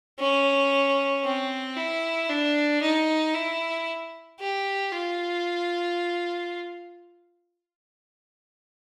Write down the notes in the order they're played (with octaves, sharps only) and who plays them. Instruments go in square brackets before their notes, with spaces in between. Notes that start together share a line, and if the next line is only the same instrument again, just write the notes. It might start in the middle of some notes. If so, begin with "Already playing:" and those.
[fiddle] C#4
C4
E4
D4
D#4
E4
G4
F4